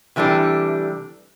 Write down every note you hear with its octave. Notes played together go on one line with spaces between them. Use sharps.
C3 E3 G3 A3 D4